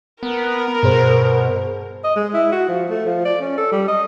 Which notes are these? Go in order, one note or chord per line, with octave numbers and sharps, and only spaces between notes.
B3 A#4
G2 B2 G#4 C5
D#5
G#3
E4
F#4
F3
A3
F3
D5
C#4
A4
G3
D#5